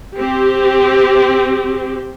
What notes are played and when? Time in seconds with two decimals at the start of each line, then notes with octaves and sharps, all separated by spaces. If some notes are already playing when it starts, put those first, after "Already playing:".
0.16 C4 G4